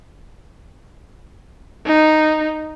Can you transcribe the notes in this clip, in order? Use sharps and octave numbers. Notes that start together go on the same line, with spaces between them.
D#4